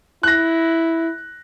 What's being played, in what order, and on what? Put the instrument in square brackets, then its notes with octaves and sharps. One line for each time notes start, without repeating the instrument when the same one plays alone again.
[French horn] E4 [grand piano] F#6 A#6